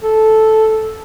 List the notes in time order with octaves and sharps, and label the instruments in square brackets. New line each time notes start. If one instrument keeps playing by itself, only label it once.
[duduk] A4